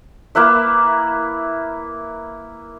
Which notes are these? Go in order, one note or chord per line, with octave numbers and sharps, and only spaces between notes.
A#3 E4 B4 E5